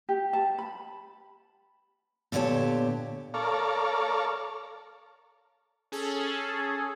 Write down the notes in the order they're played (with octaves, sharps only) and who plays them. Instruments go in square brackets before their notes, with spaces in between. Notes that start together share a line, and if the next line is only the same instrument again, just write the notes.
[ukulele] G4
A5
B5
[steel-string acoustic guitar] A#2 D3 B3 G4 C#5 A5
[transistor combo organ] A4 A#4 C#5 D5 F5
[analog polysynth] C#4 G#4 A4